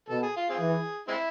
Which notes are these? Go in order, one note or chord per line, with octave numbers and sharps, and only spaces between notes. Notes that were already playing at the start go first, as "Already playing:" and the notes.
B2 A4
G#4
F4
C4 F4 G#4
E3
G#3 C4 E4